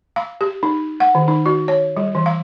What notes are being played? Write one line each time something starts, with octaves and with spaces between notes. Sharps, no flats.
F5
G4
D#4
F#5
D#3
D#4
F#4
C#5
G3
E3
F5